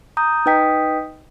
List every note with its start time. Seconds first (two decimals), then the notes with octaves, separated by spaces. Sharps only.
0.17 A#5 D#6 G6
0.46 D#4 B4 D#5 G5 D#6 B6